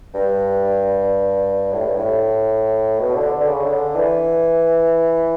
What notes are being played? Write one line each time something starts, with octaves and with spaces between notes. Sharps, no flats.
G2
A2
G2
A2
B2
D3
D3
C#3
D3
E3